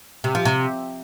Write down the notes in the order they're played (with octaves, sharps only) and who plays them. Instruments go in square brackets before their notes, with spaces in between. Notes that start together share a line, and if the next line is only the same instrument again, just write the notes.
[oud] C3
F3
C3